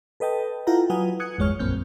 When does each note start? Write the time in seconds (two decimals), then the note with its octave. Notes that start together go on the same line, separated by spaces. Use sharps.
0.20 A4 B4 D#5 G5 A5
0.67 E4 F4 A4 F#5 G5 A#5
0.90 F#3 F4 B4 F#5 G#5 D#6
1.20 D#6 F#6 G#6 C#7
1.38 G1 E2 G#3 C#5 C#6 F6
1.59 A#1 F#2 A#3 C4 F6 G6